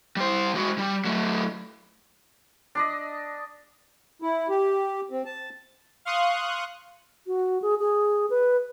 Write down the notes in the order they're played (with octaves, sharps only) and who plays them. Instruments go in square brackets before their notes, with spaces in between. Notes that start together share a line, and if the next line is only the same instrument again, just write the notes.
[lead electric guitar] G3 C5
G#3 F#4
G3
F#3 A3
[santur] D4 D5 D#5
[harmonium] E4
G4
C4
A5
[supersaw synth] F5 C6 C#6 D#6 F#6
[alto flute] F#4
G#4
G#4
B4